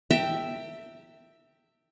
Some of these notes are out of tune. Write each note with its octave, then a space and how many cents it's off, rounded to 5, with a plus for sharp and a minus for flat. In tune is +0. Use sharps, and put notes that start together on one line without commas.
E5 +0 G5 +0 A#5 -45